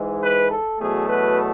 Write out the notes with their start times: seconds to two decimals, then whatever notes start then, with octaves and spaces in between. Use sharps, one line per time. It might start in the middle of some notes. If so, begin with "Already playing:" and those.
Already playing: G#2 E3 G#3
0.22 B4
0.51 A4
0.80 E2 B2 F#3 A3 G#4
1.09 B4